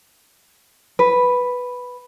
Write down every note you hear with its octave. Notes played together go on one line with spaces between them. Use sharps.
B4